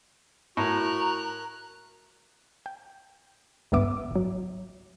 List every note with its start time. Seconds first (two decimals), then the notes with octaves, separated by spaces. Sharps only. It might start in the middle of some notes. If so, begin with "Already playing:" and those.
0.57 A2 F#4 A#4 A#5 F#6
2.66 G5
3.72 G#1 C#2 G2 B3 E5 D6
4.11 G#1 F#3